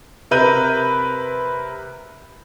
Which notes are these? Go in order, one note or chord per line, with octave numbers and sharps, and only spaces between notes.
C3 A#4 B4 G6 D#7